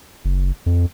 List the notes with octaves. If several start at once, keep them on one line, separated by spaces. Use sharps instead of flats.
F#1
F2